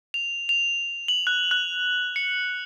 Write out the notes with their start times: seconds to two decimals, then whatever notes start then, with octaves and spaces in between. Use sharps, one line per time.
0.14 F7
0.49 F7
1.08 F#7
1.27 F#6
1.51 F#6
2.16 C#7